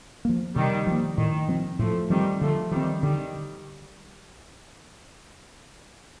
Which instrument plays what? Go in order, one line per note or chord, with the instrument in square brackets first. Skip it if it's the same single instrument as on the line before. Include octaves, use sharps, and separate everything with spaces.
[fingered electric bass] F3 A#3
[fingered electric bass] C3 [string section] D#3 G3
[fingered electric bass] F3 A#3
[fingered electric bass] A2 [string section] D#3
[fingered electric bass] F3 C4
[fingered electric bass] A2 [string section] F3 A3
[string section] D#3 G3 [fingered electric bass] F3 C4
[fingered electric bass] D3 [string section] F3 A3
[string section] D#3 G3 [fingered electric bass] F3
[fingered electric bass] C4
[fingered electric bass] D3 [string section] D#3 G3